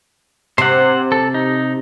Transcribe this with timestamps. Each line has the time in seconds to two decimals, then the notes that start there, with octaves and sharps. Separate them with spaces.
0.58 C3 C5 F#5
1.12 A4
1.34 D#4